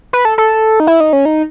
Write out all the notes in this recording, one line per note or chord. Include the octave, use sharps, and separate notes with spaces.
B4
A4
A4
D#4
E4
D#4
C#4
D#4